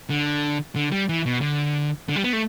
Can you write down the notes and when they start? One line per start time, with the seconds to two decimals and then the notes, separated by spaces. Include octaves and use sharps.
0.10 D3
0.76 D3
0.92 G3
1.09 E3
1.26 B2
1.42 D3
2.09 D3
2.16 G3
2.24 B3
2.33 A3